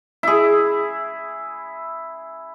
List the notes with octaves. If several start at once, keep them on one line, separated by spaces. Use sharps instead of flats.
E4 G#4